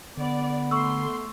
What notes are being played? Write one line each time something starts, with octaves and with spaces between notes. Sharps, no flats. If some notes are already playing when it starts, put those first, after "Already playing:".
D3 B3 D5
A3 C6 C#6 E6